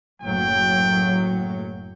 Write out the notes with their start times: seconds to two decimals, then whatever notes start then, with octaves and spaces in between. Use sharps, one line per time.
0.22 F#1 A2 F#3 G5